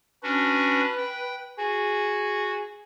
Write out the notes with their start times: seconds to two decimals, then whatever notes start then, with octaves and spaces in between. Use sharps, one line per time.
0.23 C#4 D4 F#4 B4
0.98 G5
1.58 F#4 G#4